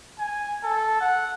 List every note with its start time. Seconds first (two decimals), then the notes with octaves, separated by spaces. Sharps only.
0.19 G#5
0.64 A4
1.01 F#5